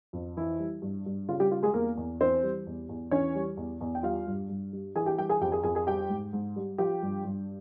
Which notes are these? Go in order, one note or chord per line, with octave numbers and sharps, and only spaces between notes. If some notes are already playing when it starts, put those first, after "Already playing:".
F2
E3 E4
G3
G2
G2
C#3 F4
G3 G4
G3 F4
G#3 G#4
E2 A#3 A#4
E2
E3 C4 C5
G3
E2
E2
E3 C#4 C#5
G3
E2
E2
G5
G3 F4 F5
G2
G2
G3
E3 G#4 G#5
G4 G5
G3 G4 G5
G#4 G#5
F2 G4 G5
G#4 G#5
F2 G#4 G#5
G#4 G#5
G3 G4 G5
G#2
G#2
G3
F3 G4 G5
G2
G2